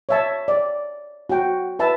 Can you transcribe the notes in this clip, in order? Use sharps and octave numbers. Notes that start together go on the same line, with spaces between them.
C#5 E5 A5
D5
F#4 G5
B4 E5 A5